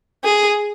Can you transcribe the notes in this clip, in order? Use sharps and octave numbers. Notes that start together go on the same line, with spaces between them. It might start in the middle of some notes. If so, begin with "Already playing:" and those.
G#4